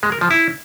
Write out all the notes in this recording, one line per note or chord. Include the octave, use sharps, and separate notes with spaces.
G#3
A#4
F3
E4